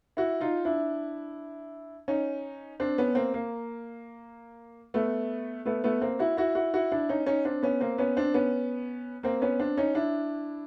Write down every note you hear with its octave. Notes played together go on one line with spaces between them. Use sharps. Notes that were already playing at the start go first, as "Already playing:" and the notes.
E4 F#4
D#4 F4
D4 E4
C#4 D#4
C4 D4
B3 C#4
A#3 C4
A#3
A3 B3
A3 B3
A3 B3
A#3 C4
E4 F#4
E4 F#4
E4 F#4
E4 F#4
D4 E4
C#4 D#4
C#4 D#4
C4 D4
B3 C#4
A#3 C4
B3 C#4
C4 D4
B3 C#4
A#3 C4
B3 C#4
C4 D4
C#4 D#4
D4 E4